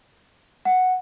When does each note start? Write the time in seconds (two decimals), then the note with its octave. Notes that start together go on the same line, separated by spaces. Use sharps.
0.65 F#5